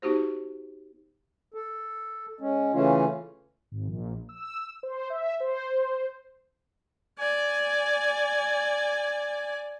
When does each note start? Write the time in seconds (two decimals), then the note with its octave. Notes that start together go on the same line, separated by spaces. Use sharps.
0.02 B3 D#4 F#4 G4 C5
1.54 A4
2.40 G#3 C#4
2.74 C#3 E3 A3 C#4 F4
3.72 G#1
3.88 A#1
4.29 E6
4.83 C5
5.10 E5
5.40 C5
7.19 D5 G#5